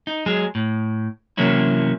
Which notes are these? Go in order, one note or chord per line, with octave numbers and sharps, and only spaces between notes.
D#4
F#3 G#3 G#4
A2
C3 E3 F#3 A#3 C#4 E4